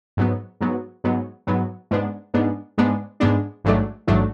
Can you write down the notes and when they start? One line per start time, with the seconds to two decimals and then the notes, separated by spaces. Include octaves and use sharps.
0.17 G#2 F#3 B3
0.61 G#2 F#3 B3
1.04 G#2 F#3 B3
1.47 G#2 F#3 B3
1.91 G#2 G#3 B3 D4
2.34 G#2 G#3 B3 D4
2.78 G#2 G#3 B3 D4
3.20 G#2 G#3 B3 D4
3.64 A1 G#2 F#3 A3 D4
4.07 A1 G#2 F#3 A3 D4